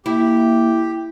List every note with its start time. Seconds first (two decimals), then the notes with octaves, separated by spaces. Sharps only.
0.06 A#3 E4 G4